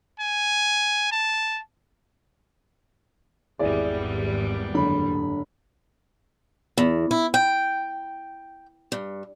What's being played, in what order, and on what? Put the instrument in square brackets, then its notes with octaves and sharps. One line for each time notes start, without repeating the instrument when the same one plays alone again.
[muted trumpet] G#5
A5
[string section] G#1 E2 G3 [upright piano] E4 G#4 D5
[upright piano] F#1 D3 B5
[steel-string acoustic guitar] E2
E4
G5
G2